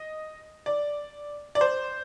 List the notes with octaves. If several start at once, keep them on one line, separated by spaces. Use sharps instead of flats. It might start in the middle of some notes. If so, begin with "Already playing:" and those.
Already playing: D#5
D5
D5
C5